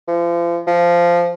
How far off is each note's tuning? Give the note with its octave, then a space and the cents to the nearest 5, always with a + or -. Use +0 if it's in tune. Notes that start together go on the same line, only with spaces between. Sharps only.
F3 -35
F3 -10